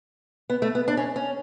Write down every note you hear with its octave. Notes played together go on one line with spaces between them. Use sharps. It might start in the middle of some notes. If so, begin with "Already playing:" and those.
B3
A3
B3
D4
C#4
C#4